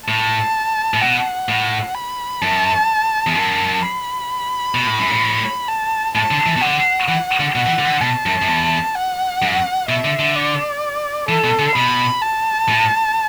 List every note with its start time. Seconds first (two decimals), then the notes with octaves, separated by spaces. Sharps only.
0.08 A2 A5
0.94 A2
1.01 B2 F#5
1.49 A2
1.95 B5
2.42 F#2 A5
3.27 E2
3.35 F#2 A5
3.82 B5
4.75 B2
4.87 A2
4.99 F#2
5.11 A2
5.68 A5
6.15 A2 A5
6.31 D3
6.46 E3
6.56 B2
6.62 D3 F#5
7.08 E3
7.40 D3
7.55 B2 F#5
7.66 E3
7.79 D3
7.85 E3
7.90 D3
8.01 B2 A5
8.26 F#2
8.42 F#2
8.48 E2
8.95 F#5
9.42 F#2
9.89 B2 E5
10.05 D3
10.19 D3
10.35 D5
11.29 E3 A4
11.44 B2
11.59 D3
11.75 B2 B5
12.22 A5
12.69 A2